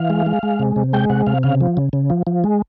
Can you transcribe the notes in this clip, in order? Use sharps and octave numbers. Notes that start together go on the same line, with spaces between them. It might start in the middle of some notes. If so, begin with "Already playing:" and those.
Already playing: E3 F5
G#3
G#3
G#3
C3
C3
G#3 G5
C3 F#5
C3 F5
C#3 F5
F3
C#3
C#3
F3
F3
G#3